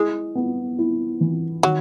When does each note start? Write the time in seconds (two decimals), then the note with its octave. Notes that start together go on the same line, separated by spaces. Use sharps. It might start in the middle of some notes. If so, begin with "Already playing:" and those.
Already playing: G#3 E4
0.35 B3
0.79 E4
1.21 E3
1.63 D#3 F#3